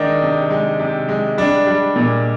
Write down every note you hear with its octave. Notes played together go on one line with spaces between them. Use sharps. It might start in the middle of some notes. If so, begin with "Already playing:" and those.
Already playing: D#3 G#3 D4 D#4
C3
G#3
C3
G#3
G3 D4
G3
A#2